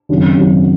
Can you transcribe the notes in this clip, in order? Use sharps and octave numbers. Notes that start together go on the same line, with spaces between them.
G#1 F#2 C#3 F#3
G#1 F#2 C#3 F#3